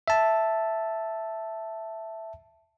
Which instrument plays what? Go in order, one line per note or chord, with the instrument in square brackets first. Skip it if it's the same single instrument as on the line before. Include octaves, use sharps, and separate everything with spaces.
[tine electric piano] E5 A5